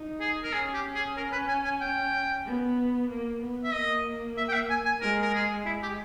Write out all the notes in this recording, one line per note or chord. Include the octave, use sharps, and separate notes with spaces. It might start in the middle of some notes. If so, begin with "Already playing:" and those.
Already playing: D#4
G#4
A#4
C#4 G#4
G4
C#4
G#4
A#4
B4
G#5
G#5
G5
B3
A#3
B3
E5
A#3 D#5
E5
G5
E5
G#5
G#5
G#3 A#4
A#4
G#4
G#3 E4
G4